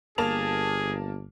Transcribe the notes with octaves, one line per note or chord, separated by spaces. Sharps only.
G1 A#3 G#4 A5 F7